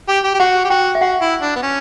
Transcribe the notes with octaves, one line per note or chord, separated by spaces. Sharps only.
G4
G4
G4
F#4 F#5
G4
F#4 G5
E5
F#4 F#5
E4
D4
B3
C#4